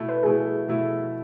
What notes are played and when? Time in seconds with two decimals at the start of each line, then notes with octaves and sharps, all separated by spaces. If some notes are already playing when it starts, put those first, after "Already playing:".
Already playing: B2 A3 E4
0.09 B4
0.23 B2 A3 E4 G#4
0.68 B2 A3 E4